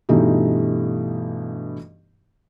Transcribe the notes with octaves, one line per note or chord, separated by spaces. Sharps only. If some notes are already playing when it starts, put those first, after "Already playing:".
G2 B2 E3 A3 D#4 G4